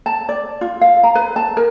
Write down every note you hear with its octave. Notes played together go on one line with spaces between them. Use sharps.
A5
D5
F4
F5
A#5
B4
A5
A#4